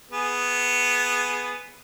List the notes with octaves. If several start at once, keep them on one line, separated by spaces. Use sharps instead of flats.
B3 G#4